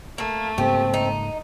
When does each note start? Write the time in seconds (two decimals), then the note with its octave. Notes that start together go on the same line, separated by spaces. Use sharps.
0.18 A3 A#3
0.58 G#2 C#3 A#3 C4 G4
0.94 D#4